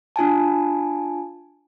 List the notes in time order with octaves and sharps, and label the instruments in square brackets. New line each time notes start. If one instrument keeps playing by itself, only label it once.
[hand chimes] D4 F4 G#5 A5